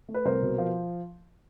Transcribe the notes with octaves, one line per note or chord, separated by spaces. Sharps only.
A3
B4
C2 A#4 C5
B2
F3